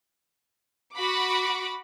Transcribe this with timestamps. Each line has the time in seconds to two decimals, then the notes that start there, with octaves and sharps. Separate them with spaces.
0.96 F#4 F#5 B5 D6